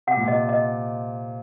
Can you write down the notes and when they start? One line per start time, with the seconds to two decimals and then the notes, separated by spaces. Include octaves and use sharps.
0.07 C3 F#5
0.17 A#2
0.27 C3 D#5
0.49 D#5